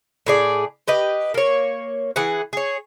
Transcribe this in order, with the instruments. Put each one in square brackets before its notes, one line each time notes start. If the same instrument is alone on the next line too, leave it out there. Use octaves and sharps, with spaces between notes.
[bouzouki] A2 G#4 D5
G4 B4 D#5
A#3 C#5
E3 G#4 F#5
G#4 C#5